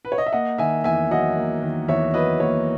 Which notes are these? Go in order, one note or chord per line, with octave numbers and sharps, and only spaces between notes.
B4
C#5
D#5
E5
A#3 D#5 F#5
D#3 E5 G#5
E2 E5 G#5
F#3 D#5 F#5
A#3
D#3
E2 C#5 E5
F#3 B4 D#5
A#3 C#5